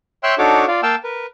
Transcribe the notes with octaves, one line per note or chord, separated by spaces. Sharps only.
C#5 E5 G5 C6 E6 F#6
D4 D#4 F#4 A4 C#5 D6
F4 D5 F5
A#3 F5 G5 A5 E6
A#4 B4